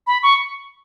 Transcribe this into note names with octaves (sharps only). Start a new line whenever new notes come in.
B5
C#6